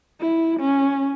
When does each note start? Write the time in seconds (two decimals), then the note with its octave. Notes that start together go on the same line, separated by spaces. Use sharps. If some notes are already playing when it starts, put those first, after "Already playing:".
0.20 E4
0.60 C#4